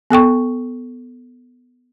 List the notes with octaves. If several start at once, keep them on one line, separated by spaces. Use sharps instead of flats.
B3 A4 G5 C#6